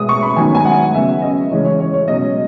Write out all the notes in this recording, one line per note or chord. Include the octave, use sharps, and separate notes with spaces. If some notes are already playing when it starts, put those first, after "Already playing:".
Already playing: B2 G#3 B3 D#6
C#6
B5
D#3 F#3 B3 G#5
G#5
F#5
C#3 F#3 B3 E5
D#5
C#3 E3 G#3 C#4 C#5
C#5
C#5
C#5
B2 F#3 C#4 D#5